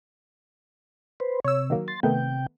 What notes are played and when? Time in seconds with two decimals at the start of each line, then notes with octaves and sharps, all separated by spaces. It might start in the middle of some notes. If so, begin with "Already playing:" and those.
1.20 B4 C5
1.45 C3 C#5 E6
1.70 D#3 F#3 A#3
1.88 C6 A6
2.03 C3 D#3 A3 B3 G5